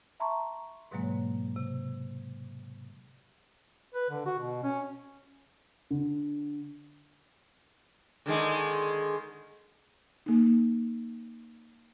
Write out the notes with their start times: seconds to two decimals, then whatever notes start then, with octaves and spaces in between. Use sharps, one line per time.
0.20 E5 A5 A#5 C6 C#6
0.91 G#2 B2 D3 F#3 G#3 A#3
1.03 C#5
1.56 C3
3.95 B4
4.11 D3
4.26 F#4
4.39 B2
4.63 C#4
5.91 D3
8.26 D3 D#3 G#3
10.26 A#3 D#4